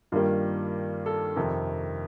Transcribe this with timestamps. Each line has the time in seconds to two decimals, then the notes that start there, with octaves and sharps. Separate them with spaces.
0.12 G2 D#3 G3 A#3 F4
1.06 A4
1.36 F2 C3 D#3